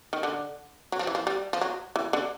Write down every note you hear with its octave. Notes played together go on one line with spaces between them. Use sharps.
D#3
D3
F#3
F3
E3
F3
G3
F3
F#3
E3
D3